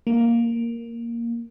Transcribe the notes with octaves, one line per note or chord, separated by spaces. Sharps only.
A#3